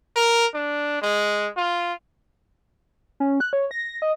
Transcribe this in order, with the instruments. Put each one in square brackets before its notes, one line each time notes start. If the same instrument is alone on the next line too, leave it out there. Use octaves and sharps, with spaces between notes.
[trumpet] A#4
D4
G#3
F4
[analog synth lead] C#4
F#6
C#5
A#6
D#5